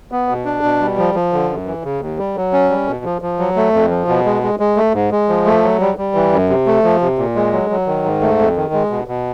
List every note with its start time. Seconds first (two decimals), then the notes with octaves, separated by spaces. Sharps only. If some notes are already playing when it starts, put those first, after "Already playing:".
0.12 B3
0.29 B2
0.45 D4
0.63 B2
0.81 G3
0.98 F3
1.15 F3
1.33 D3
1.49 F#2
1.67 E3
1.84 C#3
2.01 D#2
2.18 G3
2.36 F#3
2.53 C#4
2.70 G3
2.87 B2
3.05 F3
3.22 F3
3.39 F#3
3.56 A3
3.73 F2
3.90 F3
4.08 B2
4.25 G#3
4.42 G#3
4.60 G#3
4.77 A3
4.94 G#2
5.11 G#3
5.29 F3
5.46 A3
5.63 F#3
5.80 G3
5.98 G3
6.15 E3
6.32 F#2
6.49 C3
6.66 A3
6.84 F3
7.01 C3
7.18 A#2
7.36 G#3
7.53 F#3
7.70 F#3
7.87 D#3
8.04 G#2
8.22 A3
8.39 F2
8.56 D#3
8.73 G#3
8.90 B2
9.07 B2